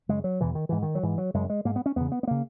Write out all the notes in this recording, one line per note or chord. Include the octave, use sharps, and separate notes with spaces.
F#2 C#3 G#3
F#3
E2 B2 E3
D#3
G#2 E3
D#3
F#3
G#2 E3
F#3
F#2 C#3 G#3
G#3
G#2 A#3
B3
C#4
E2 C#3 B3
B3
B3
C#3 A#3